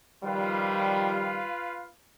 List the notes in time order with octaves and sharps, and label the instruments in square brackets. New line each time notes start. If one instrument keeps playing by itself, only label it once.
[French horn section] D#3 F3 G3 [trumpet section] F4 B4 F5